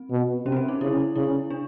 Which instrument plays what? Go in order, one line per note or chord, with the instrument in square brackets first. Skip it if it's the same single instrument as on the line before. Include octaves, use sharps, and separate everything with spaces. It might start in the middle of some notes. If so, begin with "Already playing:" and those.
Already playing: [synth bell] C4
[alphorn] B2
[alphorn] C3 [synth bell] C#4
[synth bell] C4
C#4
D#4
[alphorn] C#3 [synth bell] E4
[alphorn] C#3 [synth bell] E4
[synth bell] D4